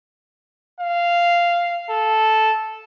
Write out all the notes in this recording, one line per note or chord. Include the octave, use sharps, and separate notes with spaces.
F5
A4